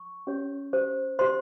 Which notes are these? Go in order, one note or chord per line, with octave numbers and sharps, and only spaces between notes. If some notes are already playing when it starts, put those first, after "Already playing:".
Already playing: C#6
C#4 G4 C#5
G4 C5
G4 C5 C6